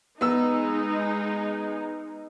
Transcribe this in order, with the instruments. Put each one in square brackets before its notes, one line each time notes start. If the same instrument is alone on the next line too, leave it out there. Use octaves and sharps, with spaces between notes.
[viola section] G#3 D#4 [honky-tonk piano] B3 E6